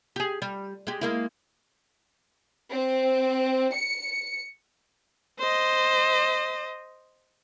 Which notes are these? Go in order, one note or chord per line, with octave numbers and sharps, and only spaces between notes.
G4 G#4
G3
G#3 G4
G#3 A#3 E4
C4
C#7
C5 D#5